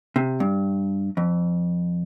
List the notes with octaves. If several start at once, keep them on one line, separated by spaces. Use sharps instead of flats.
C3
G2
F2